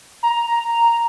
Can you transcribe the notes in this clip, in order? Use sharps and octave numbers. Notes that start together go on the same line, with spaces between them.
A#5